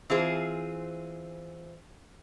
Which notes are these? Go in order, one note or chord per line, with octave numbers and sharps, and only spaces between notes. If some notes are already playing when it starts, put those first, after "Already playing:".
E3 C4 F4 G#4 C5